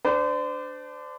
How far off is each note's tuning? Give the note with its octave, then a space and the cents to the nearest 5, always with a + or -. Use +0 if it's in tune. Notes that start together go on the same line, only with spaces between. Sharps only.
D4 +0 C5 -35